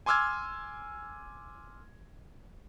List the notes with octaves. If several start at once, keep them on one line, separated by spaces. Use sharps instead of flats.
G#5 C6 D6 E6 F6 G#6